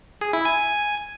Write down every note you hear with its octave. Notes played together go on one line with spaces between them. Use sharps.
G#4
E4
G#5